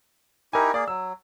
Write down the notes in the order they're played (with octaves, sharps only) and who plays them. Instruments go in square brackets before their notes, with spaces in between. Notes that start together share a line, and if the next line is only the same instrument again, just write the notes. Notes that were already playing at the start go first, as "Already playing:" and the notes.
[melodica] D#4 E4 G4 [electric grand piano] A#4 G#5
[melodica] A#3 G#4 [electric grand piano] D5
[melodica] F#3 [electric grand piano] E6